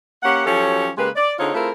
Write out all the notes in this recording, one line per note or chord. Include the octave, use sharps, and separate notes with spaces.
A#3 C#4 G4 F#5
F3 F#3 C#4 G4 A4 C#5
C#3 G#3 A#3 G4 B4
D5
D3 C4 D#4 F4 G#4 C#5
A3 C4 E4 F4 G#4 A#4